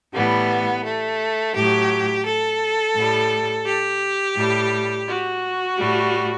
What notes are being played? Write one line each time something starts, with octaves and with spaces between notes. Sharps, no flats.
A2 E3 G3 B3
A3
A2 F#3 G4
A4
A2 G3
G4
A2 G3
F#4
A2 G3